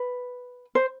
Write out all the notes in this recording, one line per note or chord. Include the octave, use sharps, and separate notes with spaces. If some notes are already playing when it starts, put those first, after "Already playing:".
Already playing: B4
C5